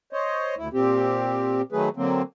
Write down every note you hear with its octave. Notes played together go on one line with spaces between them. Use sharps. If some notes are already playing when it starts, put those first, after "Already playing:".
C5 C#5 D#5
D2 E4
A#2 C4 G4
D#3 F#3 A3 G#4 B4
D3 F#3 A#3 C4